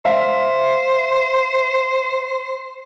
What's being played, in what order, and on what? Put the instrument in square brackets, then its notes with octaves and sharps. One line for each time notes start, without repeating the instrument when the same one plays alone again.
[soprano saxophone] C5 [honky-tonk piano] E5 F5